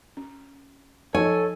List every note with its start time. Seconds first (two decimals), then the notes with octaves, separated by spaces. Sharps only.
0.17 C#4
1.15 F3 D#4 A4 C#5 G#5